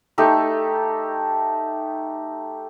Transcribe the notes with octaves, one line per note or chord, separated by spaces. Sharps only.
A3 D#4 G4 A4